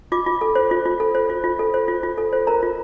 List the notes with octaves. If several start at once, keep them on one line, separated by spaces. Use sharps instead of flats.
F4 D6
F4
A4
C5
F4
F4
A4
C5
F4
F4
A4
C5
F4
F4
A4
C5
A#4 A#5
F4